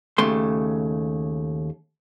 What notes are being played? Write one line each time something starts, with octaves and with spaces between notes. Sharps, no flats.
D#2 C#3 A3 C6